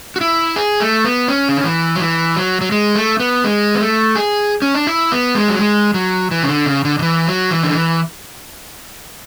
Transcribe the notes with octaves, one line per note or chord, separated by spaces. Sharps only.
F#4
E4
G#4
A3
B3
C#4
C#3
D3
E3
F#3
E3
F#3
F#3
G#3
A3
B3
G#3
B3
A3
G#4
C#4
D4
E4
B3
G#3
F#3
G#3
F#3
E3
C#3
D3
C#3
D3
D3
E3
F#3
E3
D3
E3